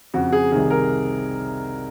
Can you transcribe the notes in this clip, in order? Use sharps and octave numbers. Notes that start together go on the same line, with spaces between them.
F2 C#3 F#4
G#4
C2 C3 D#3 G#4
A#4